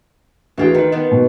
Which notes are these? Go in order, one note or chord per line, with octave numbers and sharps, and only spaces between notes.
D2 E3 F4 F#4 G#4 G5
D#3 D#4 B4
D#3 B3
B2